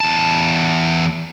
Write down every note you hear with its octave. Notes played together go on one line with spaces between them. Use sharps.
E2 A5